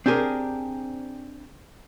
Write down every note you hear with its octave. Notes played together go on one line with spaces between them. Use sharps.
C4 D4 G4 G#4 A#4